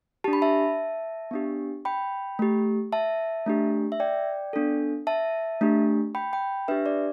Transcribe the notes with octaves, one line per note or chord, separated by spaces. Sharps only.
D4 G4 A5
B5
E5 A5
B3 D4 G4
G5 B5
A3 G4
E5 A5
A3 D4 G4
E5
D5 G5
B3 D4 A4
E5 A5
A3 D4 G4
G5 B5
G5 B5
D4 G4 B4 E5
D5